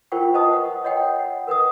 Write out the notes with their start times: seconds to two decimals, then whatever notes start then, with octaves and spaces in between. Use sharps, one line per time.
0.12 F4 A#4 C5 F#5 G5 C#6
0.34 B4 C5 D#5 A5 C#6 D#6
0.53 F#5
0.84 C#5 D#5 F#5 G5
1.19 F#5
1.47 A#4 B4 F#5 D#6